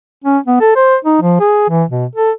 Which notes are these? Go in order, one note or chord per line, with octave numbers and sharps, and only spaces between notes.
C#4
B3
A4
C5
D#4
F3
G#4
E3
B2
A4